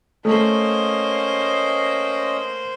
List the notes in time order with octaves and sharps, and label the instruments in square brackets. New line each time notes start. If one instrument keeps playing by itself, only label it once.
[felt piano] A3 [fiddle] A#3 C5 [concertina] C#4 D#5